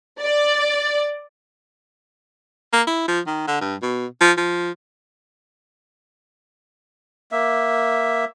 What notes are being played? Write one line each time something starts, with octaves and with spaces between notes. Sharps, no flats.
D5
A#3
E4
F3
D#3
D3
G2
B2
F3
F3
A#3 E5